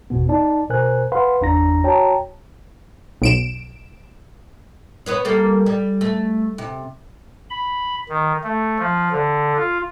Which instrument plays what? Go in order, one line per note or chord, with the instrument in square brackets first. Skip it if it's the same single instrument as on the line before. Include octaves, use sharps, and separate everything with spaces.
[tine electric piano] G1 E2 B2 B3
D#4 D5 A5
B2 A#4 C5 G#5 F#6
B4 F5 F#5 B5 C6
G1 E2 D4 A#5 A#6
F#4 C#5 G5 A5 A#5
[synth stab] B1 D7 E7
[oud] B3 B4 C#5
G3 A#3 A4
G3
A3
C3
[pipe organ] B5
D#3
A3
F3
D3
F4